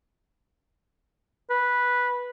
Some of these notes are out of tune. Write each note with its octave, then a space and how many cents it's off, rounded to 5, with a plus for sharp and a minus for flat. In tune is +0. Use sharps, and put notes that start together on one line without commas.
B4 -10